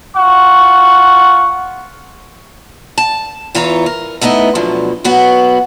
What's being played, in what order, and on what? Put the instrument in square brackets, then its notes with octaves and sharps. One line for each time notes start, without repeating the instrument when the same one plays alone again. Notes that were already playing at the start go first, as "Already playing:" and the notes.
[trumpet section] F4 F#5 C#6
[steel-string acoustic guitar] A5
E2 E3 F4 C#5 A#5
A#4
A3 B3 D#4 E4 D#5
D2 B2 D3 F3 F#3
F#3 B3 F#4